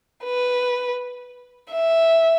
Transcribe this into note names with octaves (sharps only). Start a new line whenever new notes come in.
B4
E5